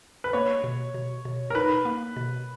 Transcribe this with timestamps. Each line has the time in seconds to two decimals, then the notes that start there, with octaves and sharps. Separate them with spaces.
0.24 B4
0.33 A#3 C#5
0.64 B2
0.94 B2
1.25 B2
1.50 A#4
1.55 D#4 B4
1.85 A#3
2.16 B2